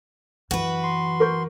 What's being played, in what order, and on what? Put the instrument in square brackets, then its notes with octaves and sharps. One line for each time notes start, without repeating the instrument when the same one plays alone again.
[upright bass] F#2 E3 [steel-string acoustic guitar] F#4 B4
[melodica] C6
[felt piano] A#4 C#6 G6